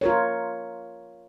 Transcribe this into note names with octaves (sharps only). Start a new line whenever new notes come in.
F4 A#4 C#5